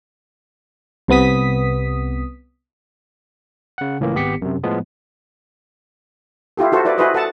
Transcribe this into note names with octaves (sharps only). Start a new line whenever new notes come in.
C2 C3 B3 D#6 B6
C#3 F#5
C#2 A2 E3 A#3
G#1 B3 G4 B6 C#7
F#2 C3
A2 F3 G#3 B3
E4 F4 G4 A4
E4 F#4 A4 C5
E4 B4 D5
E4 F#4 G#4 B4 C5 D#5
A4 F#5 A5